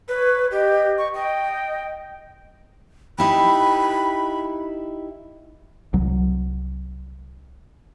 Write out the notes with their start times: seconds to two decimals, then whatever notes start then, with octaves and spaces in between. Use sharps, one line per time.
0.08 B4 C#5
0.51 G4 D#5
0.98 C#6
1.14 D#5 G5
3.18 D#4 E4 G4 B5
5.93 C2 F#3